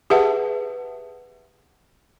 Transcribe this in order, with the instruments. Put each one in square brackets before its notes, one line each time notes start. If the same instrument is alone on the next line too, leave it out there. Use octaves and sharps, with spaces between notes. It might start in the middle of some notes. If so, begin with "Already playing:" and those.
[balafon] G4 G#4 B4 E5 F#5 A5